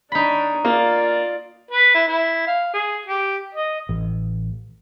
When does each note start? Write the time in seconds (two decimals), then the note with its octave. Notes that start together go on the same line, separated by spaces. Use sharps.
0.12 D4 D#4 C#5 B5
0.65 A#3 F4 D5
1.71 B4
1.95 E4
2.08 E4
2.47 F5
2.74 G#4
3.06 G4
3.54 D#5
3.89 A1